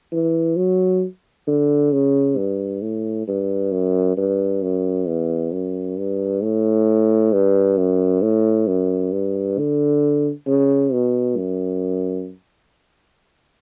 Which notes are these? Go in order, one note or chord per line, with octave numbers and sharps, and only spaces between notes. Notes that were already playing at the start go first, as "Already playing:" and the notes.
E3
F#3
D3
C#3
G2
A2
G2
F#2
G2
F#2
E2
F#2
G2
A2
G2
F#2
A2
F#2
G2
D3
C#3
B2
F#2